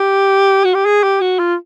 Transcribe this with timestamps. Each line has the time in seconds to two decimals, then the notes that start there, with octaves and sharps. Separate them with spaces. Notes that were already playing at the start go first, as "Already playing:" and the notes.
Already playing: G4
0.64 F#4
0.74 G4
0.86 G#4
1.03 G4
1.21 F#4
1.39 F4